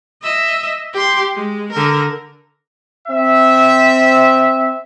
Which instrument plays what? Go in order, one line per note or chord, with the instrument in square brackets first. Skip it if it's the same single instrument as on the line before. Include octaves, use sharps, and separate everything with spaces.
[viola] D#5 E5
G4 C6
G#3
D3 A#4
[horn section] C4 E5